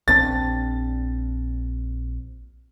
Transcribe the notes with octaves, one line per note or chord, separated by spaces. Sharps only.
A#1 C4 D4 A6